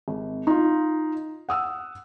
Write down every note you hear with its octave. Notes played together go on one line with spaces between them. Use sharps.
G#1
D#4 F4
F#5 D#6 E6